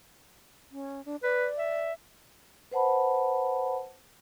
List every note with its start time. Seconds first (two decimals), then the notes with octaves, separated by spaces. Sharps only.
0.71 C#4
1.05 D4
1.23 B4 D5
1.58 E5
2.71 B4 C5 F#5 A5 B5